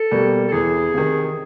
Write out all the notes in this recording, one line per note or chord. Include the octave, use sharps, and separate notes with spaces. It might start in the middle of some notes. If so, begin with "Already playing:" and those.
Already playing: A4
B2 G3 A#3
A4
E2 G#4
C3 D#3